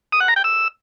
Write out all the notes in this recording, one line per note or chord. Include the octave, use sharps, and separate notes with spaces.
D#6
F#5
A#5
G5
E6